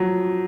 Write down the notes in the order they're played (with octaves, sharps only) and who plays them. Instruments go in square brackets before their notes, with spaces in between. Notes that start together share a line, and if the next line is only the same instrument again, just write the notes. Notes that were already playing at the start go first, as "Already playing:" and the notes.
Already playing: [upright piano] F3 F#3